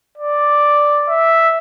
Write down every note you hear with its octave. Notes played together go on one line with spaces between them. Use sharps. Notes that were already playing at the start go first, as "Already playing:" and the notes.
D5
E5